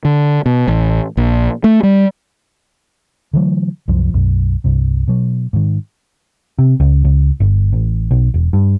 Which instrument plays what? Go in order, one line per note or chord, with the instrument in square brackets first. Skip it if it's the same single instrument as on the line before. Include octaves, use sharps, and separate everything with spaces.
[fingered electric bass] D3
B2
A1
A#1
A3
G3
D3 E3 F#3 A3
C2 F#2 F3
B1 F#2 B2
C2 G2 C3
B2 F#3
G#2 D#3
[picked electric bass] C3
C#2
C#2
G1
A1
B1
E1
G2